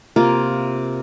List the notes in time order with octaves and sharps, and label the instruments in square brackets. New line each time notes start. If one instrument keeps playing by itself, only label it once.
[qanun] C3 A#3 F4